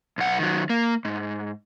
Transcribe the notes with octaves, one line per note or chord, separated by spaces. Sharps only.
B1 F#5
D#3 F#3
A#3
G#2